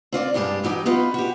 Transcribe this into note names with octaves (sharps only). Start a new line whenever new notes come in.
C4 F4 C#5 D5
G2 G#3 G4 A#4 A5
E3 F#3 D#4 G4
B3 D#4 F4 B4
F#4 G4